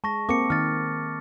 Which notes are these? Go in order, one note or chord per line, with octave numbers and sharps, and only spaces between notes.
G#3 A5 C#6 A#6
A#3 C4 A4 D6 C#7
D#3 F6 A6